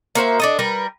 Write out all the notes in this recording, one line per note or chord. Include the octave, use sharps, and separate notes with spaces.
A#3 F#4 C5 E5
D4 A4 D#5
G3 A#4 B4